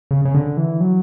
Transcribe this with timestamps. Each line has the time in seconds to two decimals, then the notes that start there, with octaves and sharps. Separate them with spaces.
0.11 C#3
0.25 C#3
0.34 D3
0.57 E3
0.80 F#3